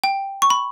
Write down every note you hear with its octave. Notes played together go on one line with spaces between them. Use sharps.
G5
C#6
B5